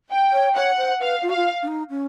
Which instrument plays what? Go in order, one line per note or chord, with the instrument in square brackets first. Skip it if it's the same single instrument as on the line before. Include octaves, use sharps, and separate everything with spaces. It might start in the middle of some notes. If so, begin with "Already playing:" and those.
[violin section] G5
[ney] C#5
[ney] C#5 [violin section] F#5
[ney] C5
[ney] B4 [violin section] F5
[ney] F4
[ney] F#4 [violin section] F5
[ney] F4
D4
D#4
C#4